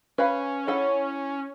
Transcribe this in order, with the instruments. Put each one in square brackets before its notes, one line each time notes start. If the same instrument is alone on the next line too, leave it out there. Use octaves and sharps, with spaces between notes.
[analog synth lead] C#4 [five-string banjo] B4 F5 B5
[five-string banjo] E4 A4 F#5